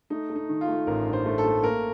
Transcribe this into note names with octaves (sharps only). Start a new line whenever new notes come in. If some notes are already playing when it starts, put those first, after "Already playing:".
A3 D#4
A3
D#4
D#3
F4
A3
A1 A#4
G2
C5
A3
A4
A3
A#3 A#4